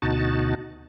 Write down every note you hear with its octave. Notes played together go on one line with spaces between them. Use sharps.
D2 B2 D#4 F#4 A5